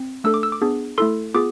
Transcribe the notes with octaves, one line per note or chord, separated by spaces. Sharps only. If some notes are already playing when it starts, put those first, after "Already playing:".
Already playing: C4
A3 D4 A4 E6
D6
E6
D6
B3 D4 G#4
A3 E4 A4 C6
B3 F4 G#4 D6